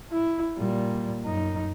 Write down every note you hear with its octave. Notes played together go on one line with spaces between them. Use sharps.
E4
A#2 G3
F#2 D#4